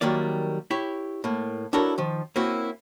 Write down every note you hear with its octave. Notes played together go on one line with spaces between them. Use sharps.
D#3 F#3 G3 A#3 D5
E4 G4 C#5
A2 A#3
D4 E4 F#4 A4 A#4 C#5
D#3 F3
A#3 C4 C#4 E4 F#4